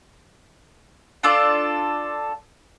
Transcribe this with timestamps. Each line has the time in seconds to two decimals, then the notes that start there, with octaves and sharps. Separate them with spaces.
1.23 D4 F4 A4 D5